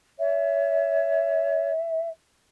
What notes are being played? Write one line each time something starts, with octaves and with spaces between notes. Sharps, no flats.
C#5 E5